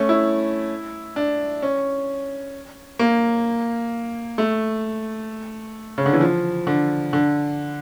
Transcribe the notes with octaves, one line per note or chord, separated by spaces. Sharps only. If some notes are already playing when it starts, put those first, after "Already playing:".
Already playing: A3 C#4
E4
D4
C#4
A#3
A3
C#3
D3
E3
F3
D3
D3